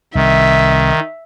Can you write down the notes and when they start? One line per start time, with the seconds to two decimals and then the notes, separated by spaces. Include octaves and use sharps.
0.15 C2 D#3 E5